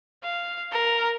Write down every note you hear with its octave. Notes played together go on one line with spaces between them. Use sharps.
F5
A#4